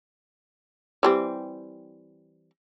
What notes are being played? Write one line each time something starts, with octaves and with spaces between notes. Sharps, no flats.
E3 G3 C4